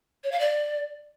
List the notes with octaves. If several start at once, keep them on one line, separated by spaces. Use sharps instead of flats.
C#5
F5
D5